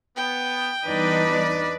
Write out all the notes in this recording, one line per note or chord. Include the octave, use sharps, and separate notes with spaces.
B3 G5
E2 G3 D4 D#4 B4 D5 D#5